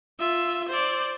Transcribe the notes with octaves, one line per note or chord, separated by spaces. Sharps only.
F4 E5
C5 D5